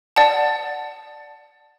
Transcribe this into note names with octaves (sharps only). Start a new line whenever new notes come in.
D5 F#5 A5